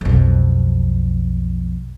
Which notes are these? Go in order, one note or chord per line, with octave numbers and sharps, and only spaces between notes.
B1 F2